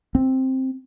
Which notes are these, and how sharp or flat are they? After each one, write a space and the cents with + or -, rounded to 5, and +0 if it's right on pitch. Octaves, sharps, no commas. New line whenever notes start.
C4 +5